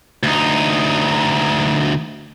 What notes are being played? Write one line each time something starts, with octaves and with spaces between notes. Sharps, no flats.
D2 D#4